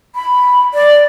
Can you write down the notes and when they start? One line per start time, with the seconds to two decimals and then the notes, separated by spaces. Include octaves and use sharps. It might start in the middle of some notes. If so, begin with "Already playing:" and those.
0.15 B5
0.74 D5